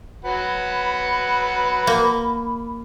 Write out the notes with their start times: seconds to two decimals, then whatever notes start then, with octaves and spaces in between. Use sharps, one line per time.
0.25 F#3 B4 F#5 B5
1.87 A#3